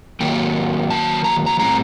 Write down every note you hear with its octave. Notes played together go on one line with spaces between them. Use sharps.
D#3 F#3 A#3 G5
A5
A#5
A#5
A2 G3 C4 A#5